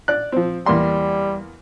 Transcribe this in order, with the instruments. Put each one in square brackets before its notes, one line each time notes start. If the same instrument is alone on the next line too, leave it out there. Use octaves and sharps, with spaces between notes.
[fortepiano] D5 F#6
F3 C4
[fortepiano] E2 A#3 C6 [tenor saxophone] G3